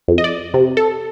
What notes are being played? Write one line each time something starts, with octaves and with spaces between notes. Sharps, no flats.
F2
D#5
D5
C3
A4